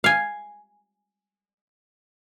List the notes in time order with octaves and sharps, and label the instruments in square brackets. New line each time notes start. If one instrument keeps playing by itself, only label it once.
[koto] F5 G#5